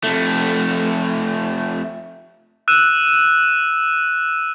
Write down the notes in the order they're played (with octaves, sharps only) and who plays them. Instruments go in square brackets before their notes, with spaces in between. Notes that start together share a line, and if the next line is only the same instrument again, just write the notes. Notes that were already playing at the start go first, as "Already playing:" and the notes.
[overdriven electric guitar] F2 A3
[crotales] E6 F#6 D#7 E7